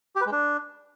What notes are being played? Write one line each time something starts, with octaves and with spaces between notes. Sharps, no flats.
G4
B4
G#3
D4